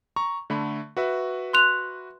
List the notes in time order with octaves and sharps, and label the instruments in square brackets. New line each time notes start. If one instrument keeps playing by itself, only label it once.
[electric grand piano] A#5 C#6
D3 A3 B5
F#4 B4 E5
[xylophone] C6 F#6 F7